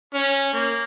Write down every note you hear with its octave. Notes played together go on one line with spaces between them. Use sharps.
C#4
A#3